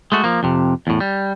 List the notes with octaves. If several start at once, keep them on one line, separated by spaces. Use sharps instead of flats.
G#3 A3 F#4
F3 A#3
F2 C3
E2 A2
G3